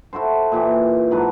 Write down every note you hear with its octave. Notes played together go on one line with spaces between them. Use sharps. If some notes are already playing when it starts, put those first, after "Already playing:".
E4 F#4 A4 C5
A#2 E3 G4
G#2 F#3 B4 A5